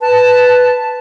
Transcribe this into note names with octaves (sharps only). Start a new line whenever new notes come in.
B4 A5